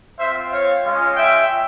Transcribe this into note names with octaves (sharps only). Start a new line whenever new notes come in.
C4 F4 C5 E5
C#5 F5
G#3 C#4 F4
E5 G5